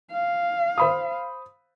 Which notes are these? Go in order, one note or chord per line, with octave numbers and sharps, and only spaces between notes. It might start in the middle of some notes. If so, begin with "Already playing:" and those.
F5
C5 B5 D#6